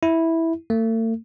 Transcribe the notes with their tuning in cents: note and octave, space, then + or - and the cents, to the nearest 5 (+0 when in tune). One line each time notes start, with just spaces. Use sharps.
E4 -10
A3 +40